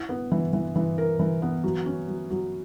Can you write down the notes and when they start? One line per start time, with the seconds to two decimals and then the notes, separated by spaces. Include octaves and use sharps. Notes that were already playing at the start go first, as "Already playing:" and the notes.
Already playing: E4
0.09 B3
0.32 E3
0.53 E3
0.76 E3
0.98 A#4
1.19 E3
1.42 B3
1.64 F#3
1.86 C#4
2.08 F#3
2.30 F#3